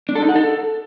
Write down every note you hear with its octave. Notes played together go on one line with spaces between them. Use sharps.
D4
A4
D#4
F#5
A4